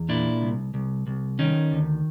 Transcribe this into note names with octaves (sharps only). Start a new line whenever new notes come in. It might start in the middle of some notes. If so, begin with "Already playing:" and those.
Already playing: E2
A#2 D4 E4
C2
C2
C2
D#3 C#4 D#4
D2